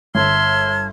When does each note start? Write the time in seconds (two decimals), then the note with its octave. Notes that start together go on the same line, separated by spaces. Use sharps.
0.15 G1 E5 A5 C6 F6 G#6